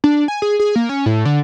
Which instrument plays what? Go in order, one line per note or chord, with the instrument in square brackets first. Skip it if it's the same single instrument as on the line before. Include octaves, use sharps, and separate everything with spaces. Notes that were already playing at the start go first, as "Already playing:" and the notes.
[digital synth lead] D4
G#5
G#4
G#4
A#3
C#4
A2
D3